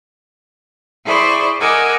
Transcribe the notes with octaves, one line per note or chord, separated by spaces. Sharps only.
E4 G#4 C5 D5 B5 C#6
A#4 D#5 F#5 G#5 D6 E6